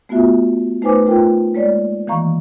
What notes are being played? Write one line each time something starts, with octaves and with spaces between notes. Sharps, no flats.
A3 B3 F4 F#4 E5
A3 D#4 B4 C5 G#5 D6
A3 F4 A#4 G5
G#3 A#3 C#5 D5
D#3 E3 A#3 F5 A#5 C#6